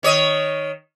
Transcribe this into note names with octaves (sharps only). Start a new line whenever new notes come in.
D#3 C#5 D#5